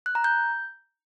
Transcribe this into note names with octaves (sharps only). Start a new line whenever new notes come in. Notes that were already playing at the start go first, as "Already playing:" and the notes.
F#6
A#5
G6